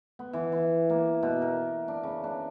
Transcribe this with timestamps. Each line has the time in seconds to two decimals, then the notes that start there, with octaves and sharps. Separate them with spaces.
0.19 B3
0.33 E3
0.52 E3
0.90 A#3
1.23 B2
1.42 A#4
1.88 D4
2.03 C#3
2.24 D4